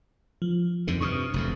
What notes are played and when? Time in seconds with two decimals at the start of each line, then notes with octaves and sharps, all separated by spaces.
0.42 F3
0.87 F2 G#2 D3
1.01 G2 C3 C#6 D#6 F6
1.34 F1 F2 D3